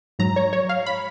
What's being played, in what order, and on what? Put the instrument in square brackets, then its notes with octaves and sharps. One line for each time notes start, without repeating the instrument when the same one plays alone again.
[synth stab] G#2 F#3 A#5
C#5
C#5
F5
B5